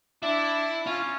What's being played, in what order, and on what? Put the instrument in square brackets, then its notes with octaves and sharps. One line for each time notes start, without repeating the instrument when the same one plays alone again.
[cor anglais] D4 [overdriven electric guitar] E4
[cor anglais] C#4 [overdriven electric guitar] F4